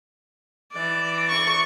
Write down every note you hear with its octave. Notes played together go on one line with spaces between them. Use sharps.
E3 D5
C#6